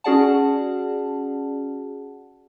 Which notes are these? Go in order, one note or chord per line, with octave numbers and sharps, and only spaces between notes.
C#4 F#4 G#4 D5 F#5 A5